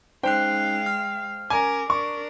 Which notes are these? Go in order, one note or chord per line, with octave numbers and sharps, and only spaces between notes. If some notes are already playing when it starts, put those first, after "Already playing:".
G#3 C#4 D#4 C5 F5 G5 F#6
F6
C#4 A#4 G#5 A#5 D6
D4 A#4 C#6